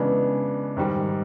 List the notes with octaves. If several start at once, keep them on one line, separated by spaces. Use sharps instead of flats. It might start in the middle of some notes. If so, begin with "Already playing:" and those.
Already playing: C#3 E3 G#3 B3 D4
G#2 D#3 G3